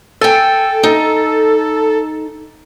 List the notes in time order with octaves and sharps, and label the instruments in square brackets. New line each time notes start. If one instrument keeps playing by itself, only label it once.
[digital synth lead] A4 [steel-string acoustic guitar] G5 G#5
[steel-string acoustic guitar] D#4